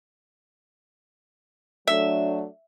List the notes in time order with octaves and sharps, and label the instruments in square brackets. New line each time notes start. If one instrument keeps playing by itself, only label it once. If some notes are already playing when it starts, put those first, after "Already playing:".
[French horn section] F#3 A3 D4 [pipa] E5